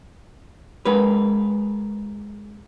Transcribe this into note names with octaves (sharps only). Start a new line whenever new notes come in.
G#3 A#4 B4